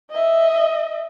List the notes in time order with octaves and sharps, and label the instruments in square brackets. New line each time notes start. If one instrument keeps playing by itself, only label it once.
[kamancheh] D#5 E5